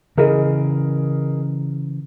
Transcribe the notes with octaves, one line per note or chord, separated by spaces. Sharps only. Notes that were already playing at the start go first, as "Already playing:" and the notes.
C#3 E3 G#4 A#4 D#5